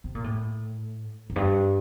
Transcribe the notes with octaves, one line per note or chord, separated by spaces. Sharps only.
C3
A#2
A2
F2
G2